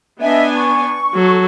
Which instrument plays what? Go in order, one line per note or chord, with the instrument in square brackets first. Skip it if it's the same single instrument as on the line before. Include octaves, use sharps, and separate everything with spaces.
[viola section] B3 D4 G#5 [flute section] D#5 E5
[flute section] C#6
[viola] F#3 [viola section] A4